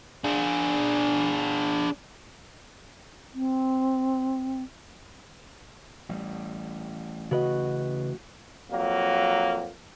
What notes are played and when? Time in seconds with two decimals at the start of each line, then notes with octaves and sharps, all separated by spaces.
0.24 D4 G#4
3.34 C4
6.09 A1 G3
7.31 C#3 F#4 B4 D#5
8.70 F2 F#3 A#3